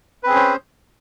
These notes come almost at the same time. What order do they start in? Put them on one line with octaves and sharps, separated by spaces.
B4 C4 G#4 C#4 C5